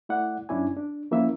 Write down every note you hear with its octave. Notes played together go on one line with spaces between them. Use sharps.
A3 E4 D5 F#5
F#2 C#4 D4 E4 D5 G#5
D4
F3 A#3 C#4 E4 E5